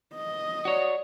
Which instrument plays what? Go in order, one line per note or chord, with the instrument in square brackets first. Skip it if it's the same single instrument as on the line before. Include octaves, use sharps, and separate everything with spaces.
[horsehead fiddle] D#5
[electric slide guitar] F#4 C#5 [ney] D5